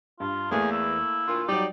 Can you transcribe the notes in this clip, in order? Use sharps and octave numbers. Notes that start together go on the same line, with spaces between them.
G2 F4
E2 A3 A#3 G#4
E4
D2 A#2 F4
F#3 G3 D#4 G4 D5